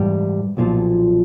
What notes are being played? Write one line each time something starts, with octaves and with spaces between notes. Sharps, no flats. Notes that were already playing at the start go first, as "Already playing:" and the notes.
Already playing: G#2 E3 G3 G5
B1 A#2 F3